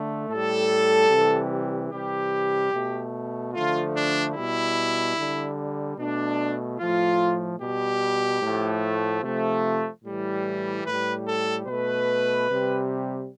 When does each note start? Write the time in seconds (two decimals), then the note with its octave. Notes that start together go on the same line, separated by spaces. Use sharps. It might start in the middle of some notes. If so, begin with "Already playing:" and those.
Already playing: D3 A3
0.29 A2 G3 A4
1.10 C3 E3 G3
1.91 C3 E3 G3 G4
2.73 B2 A3
3.54 D3 F3 A3 F4
3.95 D4
4.35 B2 G3 E4
5.17 D3 G3
5.98 B2 A3 D4
6.79 A2 F3 A3 F4
7.60 B2 G3 G4
8.42 A2 F3 A3
9.23 C3 F3 A3
10.04 A2 E3 G3
10.85 A2 G3 B4
11.27 A4
11.66 B2 A3 B4
12.48 C3 G3